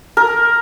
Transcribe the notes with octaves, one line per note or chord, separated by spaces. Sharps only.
A#4